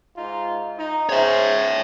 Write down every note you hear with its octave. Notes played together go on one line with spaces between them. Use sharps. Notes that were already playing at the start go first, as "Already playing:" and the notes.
G#2 D#4 F4
D#4
C#4 G#4 C5 C#5 E5